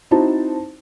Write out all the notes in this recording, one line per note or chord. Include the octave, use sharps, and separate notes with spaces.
C4 D#4 E4 F#4 C5 A5